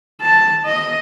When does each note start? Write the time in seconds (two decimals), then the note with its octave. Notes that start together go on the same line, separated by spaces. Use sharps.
0.21 A5
0.66 D#5